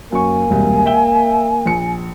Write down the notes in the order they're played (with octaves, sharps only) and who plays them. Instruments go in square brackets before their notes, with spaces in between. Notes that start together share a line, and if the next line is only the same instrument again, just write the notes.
[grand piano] F#2 C#6 [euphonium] A#3 [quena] G#5
[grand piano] E1 C2
E5 G5 G7
A#1 C#7